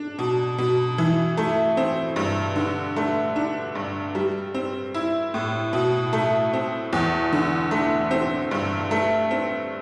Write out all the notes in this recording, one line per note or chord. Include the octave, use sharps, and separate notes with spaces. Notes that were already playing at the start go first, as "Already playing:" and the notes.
Already playing: D4
B2
B2
E3
A3
C4
G2
D3
A3
D4
G2
G3
C4
E4
A2
B2
A3
C4
E2
D3
A3
C4
G2
A3
C4